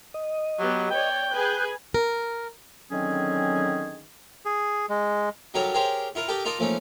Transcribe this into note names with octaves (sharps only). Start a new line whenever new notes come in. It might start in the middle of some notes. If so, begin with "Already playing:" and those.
D#5
F#3 B3 G4
C#5 D5 G5
G#4 B4 G#5 F#6 G6
A#4
D3 D#3 F#3 C4 C#4 G#4
G#4
G#3
F#3 G3 D#4 A4 A#4 C#5
G4 G#4 A#4 C5 C#5
E4 F4 A#4
G4 A4 A#4 D#5 G5
D#4 F4 A#4 D5 A5 D#6
F3 A3 A#3 C#4 D#4